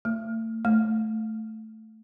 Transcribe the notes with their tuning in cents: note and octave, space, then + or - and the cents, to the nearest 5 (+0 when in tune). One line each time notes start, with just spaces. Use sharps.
A3 +35
A3 +0